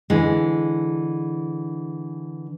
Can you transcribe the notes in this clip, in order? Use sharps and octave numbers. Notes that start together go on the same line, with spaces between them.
D3 E3 G#3